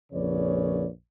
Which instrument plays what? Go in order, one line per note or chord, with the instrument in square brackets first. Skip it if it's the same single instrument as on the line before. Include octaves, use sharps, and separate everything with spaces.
[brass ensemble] A#1 F2 C#3 B4 C#5 D5